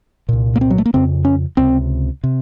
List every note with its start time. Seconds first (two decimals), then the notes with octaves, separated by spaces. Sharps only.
0.29 C2 A#2
0.56 A#3
0.61 C4
0.70 F#3
0.78 A3
0.86 A#3
0.94 F2 C#3 C4
1.25 C#4
1.57 C#2 C3 C4
2.24 C3